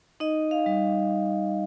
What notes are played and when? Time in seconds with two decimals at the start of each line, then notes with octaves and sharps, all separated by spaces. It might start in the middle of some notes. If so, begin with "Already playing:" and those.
0.20 D#4 D#5
0.51 F5
0.66 G3